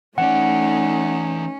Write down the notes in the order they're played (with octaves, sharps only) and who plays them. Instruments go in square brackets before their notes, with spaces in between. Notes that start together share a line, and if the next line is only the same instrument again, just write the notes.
[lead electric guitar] E3 D5 [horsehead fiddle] A3 D#4 [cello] C#4 [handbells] F#5